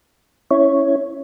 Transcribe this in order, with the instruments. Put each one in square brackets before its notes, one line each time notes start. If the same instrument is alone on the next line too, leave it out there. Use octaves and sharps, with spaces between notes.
[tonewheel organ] C#4 E4 C#5